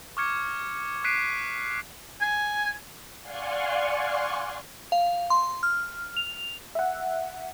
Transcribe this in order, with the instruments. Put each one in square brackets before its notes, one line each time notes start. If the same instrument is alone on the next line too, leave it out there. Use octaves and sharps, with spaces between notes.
[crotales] C#6 D6 F6 G#6 C#7
D6 F#6 B6 C7 D7 D#7
[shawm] G#5
[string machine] D5 F5 F#5 G#5 C6 C#6
[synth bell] F5
C6
F6
F7
[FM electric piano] E5 F#5